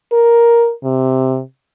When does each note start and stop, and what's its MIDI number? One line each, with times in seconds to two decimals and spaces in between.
0.12 0.72 70
0.84 1.41 48